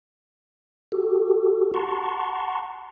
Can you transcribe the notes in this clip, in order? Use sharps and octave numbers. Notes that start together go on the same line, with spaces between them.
F#4 G4 A4
F#5 A5 A#5 C6 C#6